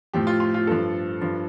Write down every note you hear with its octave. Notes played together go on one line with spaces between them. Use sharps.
A2 F3 G4
F4
F4
F4
G2 F3 A4
G2 F3